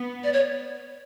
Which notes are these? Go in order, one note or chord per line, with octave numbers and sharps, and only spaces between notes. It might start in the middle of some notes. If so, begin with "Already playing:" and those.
Already playing: B3
D5
C#5